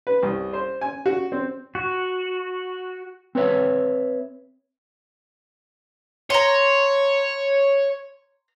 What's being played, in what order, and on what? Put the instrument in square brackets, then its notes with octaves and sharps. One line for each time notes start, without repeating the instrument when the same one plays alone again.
[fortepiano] B4
C2
C5
G#5
F#4
C4
[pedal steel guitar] F#4
[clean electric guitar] C4 B4 C#5 E5
[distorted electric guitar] C#5 [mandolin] A#5 C6